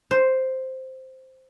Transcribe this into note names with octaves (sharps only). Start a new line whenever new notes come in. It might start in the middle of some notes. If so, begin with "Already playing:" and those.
C5